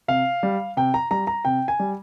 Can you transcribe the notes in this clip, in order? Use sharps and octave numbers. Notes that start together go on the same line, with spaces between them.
C3 F5
G3
C3 G5
A#5
G3 A#5
A#5
C3 G5
G#5
G3